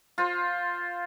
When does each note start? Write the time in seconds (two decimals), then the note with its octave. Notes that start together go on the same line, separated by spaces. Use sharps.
0.18 F4 C5